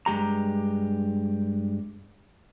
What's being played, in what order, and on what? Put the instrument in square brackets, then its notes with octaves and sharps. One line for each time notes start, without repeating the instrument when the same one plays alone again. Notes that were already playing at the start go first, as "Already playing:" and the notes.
[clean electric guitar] G2 G#3 G4 A#5